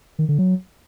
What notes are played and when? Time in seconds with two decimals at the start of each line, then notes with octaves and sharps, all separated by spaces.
0.19 D#3
0.29 D3
0.39 F#3